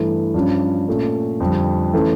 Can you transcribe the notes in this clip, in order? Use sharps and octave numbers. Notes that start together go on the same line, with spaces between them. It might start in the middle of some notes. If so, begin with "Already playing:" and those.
Already playing: G2 E3 A3
G2 F3 C#4
A#2 A3 C#4
F2 D3 G3
E3 A3 C#4